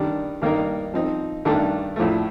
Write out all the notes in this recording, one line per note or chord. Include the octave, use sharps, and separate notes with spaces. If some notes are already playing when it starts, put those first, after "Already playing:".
Already playing: D#3 G3 D4
G2 D#3 A#3 D#4 A#4
F3 C4 D#4
G2 D#3 A3 D4 A4
A#1 A2 F3 A3